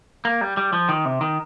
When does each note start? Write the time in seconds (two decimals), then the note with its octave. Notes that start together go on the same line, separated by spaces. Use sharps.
0.25 A#3
0.41 G3
0.57 G3
0.73 F3
0.89 D#3
1.05 C3
1.21 D#3